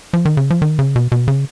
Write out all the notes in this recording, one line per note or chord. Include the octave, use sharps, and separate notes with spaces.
F3
D#3
C#3
F3
D#3
C#3
B2
B2
C#3